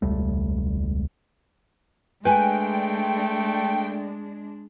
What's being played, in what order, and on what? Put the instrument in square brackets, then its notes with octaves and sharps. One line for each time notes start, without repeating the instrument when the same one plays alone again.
[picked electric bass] E1 C#2 G3 A3
[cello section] G#3 D4 [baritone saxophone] A3 [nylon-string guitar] B4 G#5 [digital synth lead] G5